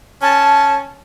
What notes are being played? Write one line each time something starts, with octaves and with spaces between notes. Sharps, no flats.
C#4 A5